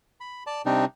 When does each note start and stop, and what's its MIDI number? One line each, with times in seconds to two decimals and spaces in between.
0.20 0.43 83
0.47 0.62 74
0.47 0.62 81
0.66 0.85 48
0.66 0.85 55
0.66 0.85 60
0.66 0.85 62
0.66 0.85 63